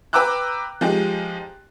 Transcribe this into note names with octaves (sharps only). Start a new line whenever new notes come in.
B4 G5 A#5 D6 E6 F#6
F3 G#3 D#4 G4